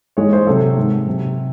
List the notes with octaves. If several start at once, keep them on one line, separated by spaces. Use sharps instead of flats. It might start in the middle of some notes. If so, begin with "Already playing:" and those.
G#2 E3 G#3 C#5
C5
C3 F#3 A4
G#2 D#3 G#3
C3 F#3